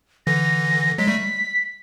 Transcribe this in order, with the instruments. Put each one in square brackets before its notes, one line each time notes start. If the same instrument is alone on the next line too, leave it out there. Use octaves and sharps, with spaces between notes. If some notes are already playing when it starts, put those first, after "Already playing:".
[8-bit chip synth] D3 E3 [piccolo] A#6
[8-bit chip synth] F#3 G#3 [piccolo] B6
[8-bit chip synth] G3 A3